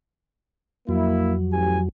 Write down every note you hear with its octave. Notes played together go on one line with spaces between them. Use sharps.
F2 F#3 A#3 E4
A1 G4 G#5